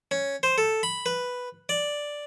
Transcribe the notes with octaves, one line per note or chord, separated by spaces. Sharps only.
C#4
C5
A4
B5
B4
D5